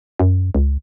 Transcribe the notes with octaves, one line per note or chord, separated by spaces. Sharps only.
F#2
C#2